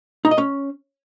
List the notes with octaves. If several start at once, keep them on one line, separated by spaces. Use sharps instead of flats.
D#4
D#5
C#4